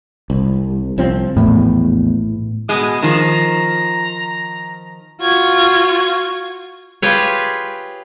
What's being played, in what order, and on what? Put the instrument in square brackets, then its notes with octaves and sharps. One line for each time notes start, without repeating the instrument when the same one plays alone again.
[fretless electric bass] C2
C2 F3 C4
[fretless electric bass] A#1 E2 [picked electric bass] A2
[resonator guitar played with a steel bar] B2 G#3 [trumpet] D#6
[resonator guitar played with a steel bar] D#3 F3 [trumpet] A#5
[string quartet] F4 F#4 G#6
[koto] F4 G4 G#4 B4 C#5